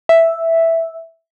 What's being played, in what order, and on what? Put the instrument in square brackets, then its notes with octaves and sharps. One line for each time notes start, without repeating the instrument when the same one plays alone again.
[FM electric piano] E5